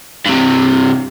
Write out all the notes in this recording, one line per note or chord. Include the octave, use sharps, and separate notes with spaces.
G2 C3